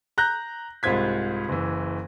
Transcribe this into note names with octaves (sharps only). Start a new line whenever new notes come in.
A#5 F#6 G6 A#6
C2 G#2 F4 C5 G#6 B6
F#1 E3